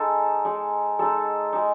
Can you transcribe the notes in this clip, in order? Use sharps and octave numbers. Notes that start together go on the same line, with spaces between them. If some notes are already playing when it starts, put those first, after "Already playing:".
Already playing: G#3 D#4 A4
G#3 D#4
G#3 D#4 A4
G#3 D#4